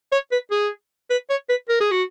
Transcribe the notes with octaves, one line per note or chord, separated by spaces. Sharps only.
C#5
B4
G#4
B4
C#5
B4
A#4
G#4
F#4